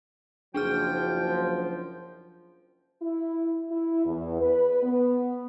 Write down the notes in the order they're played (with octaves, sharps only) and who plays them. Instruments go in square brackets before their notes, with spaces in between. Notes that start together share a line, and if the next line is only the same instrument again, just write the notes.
[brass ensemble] F#1 F3 [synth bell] D4 G#4 F6 [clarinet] G5
[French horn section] E4
E4
E2
B4
B3